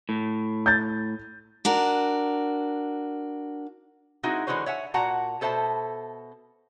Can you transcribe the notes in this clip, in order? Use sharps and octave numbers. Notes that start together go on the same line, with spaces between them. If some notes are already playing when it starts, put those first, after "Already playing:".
A2
G6 A6
D4 F#4 A#4
G#3 C4 D#4 E4 F#4
D3 E3 G#3 F#4 C5 C#5
C#5 E5 F#5 G#5
A#2 F#4 F#5 A5 A#5
B2 A4 C5 E5 A5